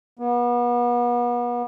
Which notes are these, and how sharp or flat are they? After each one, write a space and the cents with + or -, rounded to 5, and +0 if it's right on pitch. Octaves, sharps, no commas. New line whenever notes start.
B3 -35